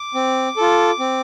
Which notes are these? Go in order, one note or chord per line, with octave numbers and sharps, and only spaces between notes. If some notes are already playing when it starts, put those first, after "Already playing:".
Already playing: D6
C4
F4 A4
C4